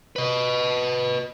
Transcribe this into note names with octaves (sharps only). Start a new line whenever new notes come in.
B4 D#5